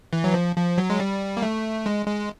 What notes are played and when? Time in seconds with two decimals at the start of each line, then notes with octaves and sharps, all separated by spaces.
0.13 E3
0.24 F#3
0.34 F3
0.56 F3
0.78 F#3
0.90 G#3
1.00 G3
1.37 A#3
1.42 A3
1.86 G#3
2.07 G#3